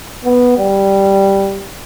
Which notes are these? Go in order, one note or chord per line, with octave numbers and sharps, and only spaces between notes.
B3
G3